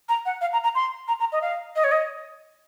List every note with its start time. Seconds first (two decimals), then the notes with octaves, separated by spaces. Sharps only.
0.09 A#5
0.26 F#5
0.41 F5
0.53 A#5
0.64 A#5
0.75 C6
1.08 A#5
1.20 A#5
1.32 D#5
1.42 F5
1.76 D#5
1.84 C#5
1.92 D#5